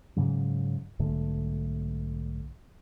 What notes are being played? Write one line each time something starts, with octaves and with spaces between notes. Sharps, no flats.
G#2 C#3 F#3
B1 G#2 D3 A3